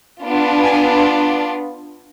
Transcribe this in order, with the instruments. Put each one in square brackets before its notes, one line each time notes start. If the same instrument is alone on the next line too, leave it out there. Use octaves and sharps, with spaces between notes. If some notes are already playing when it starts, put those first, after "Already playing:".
[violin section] B3 D4 F4
G#5